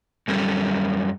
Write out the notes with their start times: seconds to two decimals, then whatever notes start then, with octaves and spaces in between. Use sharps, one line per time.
0.28 F#2 G3 C#4 A4